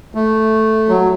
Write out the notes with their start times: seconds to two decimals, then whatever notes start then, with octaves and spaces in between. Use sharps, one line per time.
0.15 A3
0.89 F#3